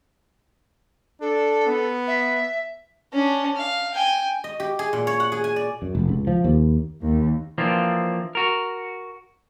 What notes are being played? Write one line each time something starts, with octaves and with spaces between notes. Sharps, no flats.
D4 A4
B3
E5
C#4 D4
F5
G5 G#5
D#5
G4
G#4
A#2
C#5
F#5
G#4
G#5
D5
F#2
F1
C#2
F3
D#2
D#2
E3 F3 A#3 C4 D4 F4
F#4 A#4